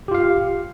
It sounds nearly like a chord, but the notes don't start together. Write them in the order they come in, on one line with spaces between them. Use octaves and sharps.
G4 F4 F5